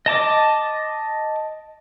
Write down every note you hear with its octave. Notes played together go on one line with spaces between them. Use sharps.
D#5 A5 D6